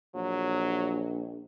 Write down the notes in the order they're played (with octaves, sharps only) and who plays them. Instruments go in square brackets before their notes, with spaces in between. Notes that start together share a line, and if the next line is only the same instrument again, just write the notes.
[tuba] A#1 [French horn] F#3